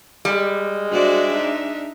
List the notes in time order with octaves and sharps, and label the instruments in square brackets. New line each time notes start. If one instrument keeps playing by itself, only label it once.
[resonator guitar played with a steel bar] G3 [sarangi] G#3
[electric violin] D4 E5 [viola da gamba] F#4 C5 D5
[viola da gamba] D#4